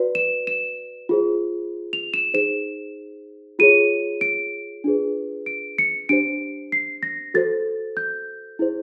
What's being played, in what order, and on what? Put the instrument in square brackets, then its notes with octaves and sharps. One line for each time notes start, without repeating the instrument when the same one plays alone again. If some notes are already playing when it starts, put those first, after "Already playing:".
Already playing: [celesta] F#4 B4 D5
E7
E7
F4 G#4 C5
F7
E7
D#4 G#4 C5 E7
F4 G#4 C#5 D#7
D7
D4 F4 G#4 B4
D7
C#7
D4 G4 C5 D7
C7
A#6
F#4 A4 C5 A6
G6
E4 G#4 C5